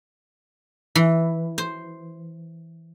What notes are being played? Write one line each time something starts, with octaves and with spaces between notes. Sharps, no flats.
E3
C5